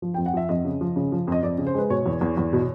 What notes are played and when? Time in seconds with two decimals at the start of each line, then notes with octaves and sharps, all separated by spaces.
0.02 F3
0.14 F2 G5
0.26 F#5
0.34 F3 E5
0.49 F2 D#5
0.65 C#3
0.81 F3
0.96 C#3
1.12 F3
1.27 F2 D#5
1.43 F2 D5
1.58 C#3
1.67 C5
1.74 G#3 B4
1.90 B2 C#5
2.06 E2
2.21 E2
2.37 E2
2.53 B2